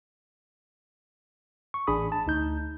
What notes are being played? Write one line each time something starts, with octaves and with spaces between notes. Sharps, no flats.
C#6
A1 D4 G#4 B5 D#6
A5
D2 D#4 G6